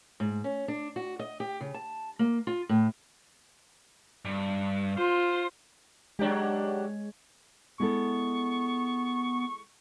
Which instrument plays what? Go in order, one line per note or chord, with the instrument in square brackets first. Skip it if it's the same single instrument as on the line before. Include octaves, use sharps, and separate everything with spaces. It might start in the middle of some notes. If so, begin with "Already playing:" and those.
[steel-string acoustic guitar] G#2
C#4
D4
F#4
D#5
G4
C#3
A5
A#3
F4
A2
[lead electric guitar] G2
[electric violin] F4 [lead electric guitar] C5
[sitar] F#3 D4 G4 [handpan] G#3 C#5
[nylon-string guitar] G#3 E4 A4 [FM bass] B3 [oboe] C#6